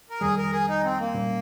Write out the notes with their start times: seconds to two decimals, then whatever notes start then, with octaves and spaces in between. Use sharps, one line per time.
0.10 A#4
0.21 F2 D#3 G3 G#4
0.38 A#4
0.52 G#4
0.68 D#4
0.84 C4
0.99 A#3
1.14 A#2 G3 C#4